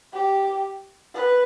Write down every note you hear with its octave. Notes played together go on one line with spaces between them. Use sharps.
G4
B4